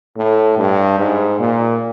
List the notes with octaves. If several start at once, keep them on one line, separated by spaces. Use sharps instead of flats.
A2
G2
G#2
A#2